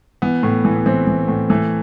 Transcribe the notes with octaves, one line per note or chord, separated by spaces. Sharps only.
E3 B3
A2
E3
B3
E3 C4
E3
A2
E3 A3